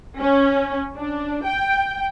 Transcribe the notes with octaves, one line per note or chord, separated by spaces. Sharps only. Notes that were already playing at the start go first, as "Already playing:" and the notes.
C#4
D4
G5